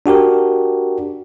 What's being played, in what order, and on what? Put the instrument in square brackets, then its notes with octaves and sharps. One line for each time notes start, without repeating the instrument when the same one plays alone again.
[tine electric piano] D4 F#4 G4 A#4